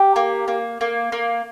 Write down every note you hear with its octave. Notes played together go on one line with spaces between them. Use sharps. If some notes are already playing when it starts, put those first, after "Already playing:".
Already playing: G4
A#3
A#3
A#3
A#3